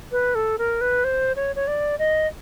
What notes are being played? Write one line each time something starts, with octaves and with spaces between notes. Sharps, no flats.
B4
A4
A#4
B4
C5
C#5
C#5
D5
D#5